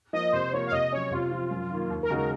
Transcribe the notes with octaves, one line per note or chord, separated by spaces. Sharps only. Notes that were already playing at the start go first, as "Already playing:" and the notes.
F3 A#3 D#5
C3 C5
F3 A#3 F4 C#5
F5
C3 D#5
F#3 C#4 C#5
C3 F4
F3 C4
F#2
D#3 A#3
D#2
A#4
C#3 G#3 D#4 F#4
A#4